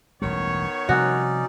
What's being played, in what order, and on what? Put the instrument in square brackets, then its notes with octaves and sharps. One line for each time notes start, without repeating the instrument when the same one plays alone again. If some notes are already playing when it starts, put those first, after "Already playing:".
[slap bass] E1 A1 G3 [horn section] D#3 B3 C#5
[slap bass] C3 F3 G3 [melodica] C#4 D#4 D5 [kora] F#4